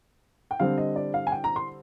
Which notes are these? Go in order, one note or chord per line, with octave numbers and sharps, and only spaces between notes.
G5
D3 G3 C4 F5
D#5
D5
F5
G#5
G5
A#5
C6